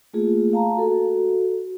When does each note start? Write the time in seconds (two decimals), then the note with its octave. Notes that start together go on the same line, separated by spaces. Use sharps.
0.14 A3 A#3 F4 G#4
0.53 F5 A5 A#5
0.77 F#4 A4